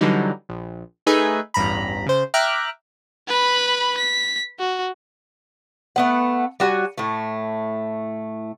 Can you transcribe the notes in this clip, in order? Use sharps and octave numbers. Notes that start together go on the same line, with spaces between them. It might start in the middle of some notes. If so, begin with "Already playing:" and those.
D3 E3 F#3 G3 D#4
A#1
A3 D#4 G#4 B4 E5 G#5
A1 E2 G2 A#5 B5
C#3 C5
E5 G5 A#5 D6 F6 F#6
B4 B5
B6
F#4
A3 B3 F#5
G3 F#4 C#5 G#5
A2 A3